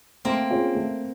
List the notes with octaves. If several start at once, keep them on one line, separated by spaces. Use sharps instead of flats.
A3 A#3 C4
C#4 F4 G#4
A3